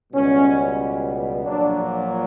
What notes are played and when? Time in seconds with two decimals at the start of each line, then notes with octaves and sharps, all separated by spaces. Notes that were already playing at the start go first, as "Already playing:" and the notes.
0.13 C#2 B2 G3 C#4
1.44 A#1 A#2 F#3 D4